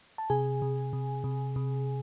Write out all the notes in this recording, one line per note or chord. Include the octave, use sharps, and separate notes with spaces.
A5
C3 G#4 G#5
C3
C3
C3
C3